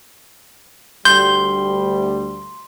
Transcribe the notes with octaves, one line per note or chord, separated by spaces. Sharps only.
D2 G3 C6 G6